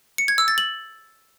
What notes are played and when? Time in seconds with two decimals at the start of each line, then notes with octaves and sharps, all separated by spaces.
0.18 C#7
0.28 G#6
0.38 E6
0.48 A6
0.58 F#7